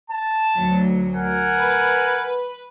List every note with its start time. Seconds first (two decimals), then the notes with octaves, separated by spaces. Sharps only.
0.11 A5
0.57 D2 F#3
1.15 A#4 F#5 G#5
1.58 B4